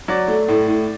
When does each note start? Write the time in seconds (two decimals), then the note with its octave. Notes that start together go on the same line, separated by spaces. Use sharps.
0.08 F#3 D5
0.28 A3
0.48 A2
0.68 A2